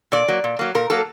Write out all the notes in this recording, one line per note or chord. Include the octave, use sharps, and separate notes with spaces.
A#2 D5
F#3 A#3
A#2
F#3 A#3
A#2 A#4
F#3 A#3 A4